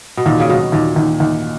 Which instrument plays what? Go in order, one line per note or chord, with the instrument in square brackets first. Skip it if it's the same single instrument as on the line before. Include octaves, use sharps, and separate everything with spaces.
[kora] B2
[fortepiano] D#2 [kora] A#2
[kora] C#3
[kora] B2 [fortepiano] F#3
[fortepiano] D#2 [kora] A#2
[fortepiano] D#2
D#2